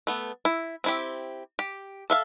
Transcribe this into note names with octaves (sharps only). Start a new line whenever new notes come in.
A3 B3
E4
C4 E4 G4
G4
A4 E5 F5